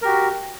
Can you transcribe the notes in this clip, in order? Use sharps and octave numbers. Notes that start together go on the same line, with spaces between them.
F#4 G4 A#4